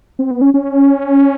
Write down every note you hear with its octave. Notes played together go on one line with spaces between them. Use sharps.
C4
B3
C#4
C#4